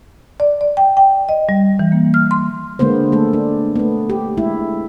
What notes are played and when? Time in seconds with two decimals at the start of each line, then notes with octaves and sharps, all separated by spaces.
0.40 D5
0.61 D5
0.77 G5
0.97 G5
1.29 D#5
1.49 G3
1.79 E3
1.92 A#3
2.14 F6
2.31 C6
2.79 D3 G#3 A#3 B3 C5
3.12 A3 A4
3.33 D4
3.76 A3 B3
4.10 G4
4.37 G#3 E4